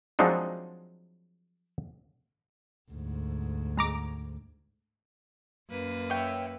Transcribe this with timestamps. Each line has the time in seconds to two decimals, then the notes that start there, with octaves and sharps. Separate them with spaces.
0.19 F3 F#3 G#3 C4 D4 D#4
2.91 D2 G#2
3.77 G#3 A#5 D6
5.69 F#2 A#3 B4
6.10 C#5 E5 G5